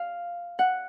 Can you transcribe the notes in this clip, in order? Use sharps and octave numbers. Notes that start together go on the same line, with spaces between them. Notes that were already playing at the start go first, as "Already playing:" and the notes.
Already playing: F5
F#5